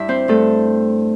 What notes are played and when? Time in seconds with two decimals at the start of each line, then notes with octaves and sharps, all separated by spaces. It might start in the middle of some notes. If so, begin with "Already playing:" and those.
Already playing: G2 D4 E4 D5 E5
0.08 C4 C5
0.28 G2 A3 A4